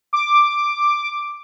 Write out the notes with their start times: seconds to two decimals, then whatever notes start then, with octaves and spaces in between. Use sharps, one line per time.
0.13 D6